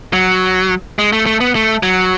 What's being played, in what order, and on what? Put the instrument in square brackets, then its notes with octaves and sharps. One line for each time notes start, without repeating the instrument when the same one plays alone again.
[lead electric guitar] F#3
G#3
A3
A3
B3
A3
F#3